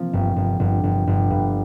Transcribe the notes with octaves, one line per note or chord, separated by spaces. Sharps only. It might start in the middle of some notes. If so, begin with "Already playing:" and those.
Already playing: F3 A#3 C4
G1
G1
G1
G1
G1
G2